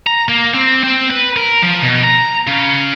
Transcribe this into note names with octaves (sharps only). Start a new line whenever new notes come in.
A#5
A#3
C4
C4
B4
A#4
F3
B2
A#5
C#3